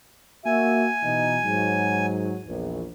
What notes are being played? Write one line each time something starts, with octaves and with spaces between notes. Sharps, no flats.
A#3 F#4 E5 G#5
B2 E3 D#4
G#2 F#3
A#1 E2